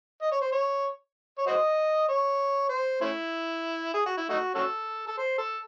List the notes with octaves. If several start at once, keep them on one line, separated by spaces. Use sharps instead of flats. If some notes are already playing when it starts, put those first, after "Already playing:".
D#5
C#5
C5
C#5
C#5
F#4 C5 D#5
C#5
C5
A3 C#4 E4
G#4
F#4
E4
A3 D#4 F#4
C#4 F#4 A4
A4
C5
A4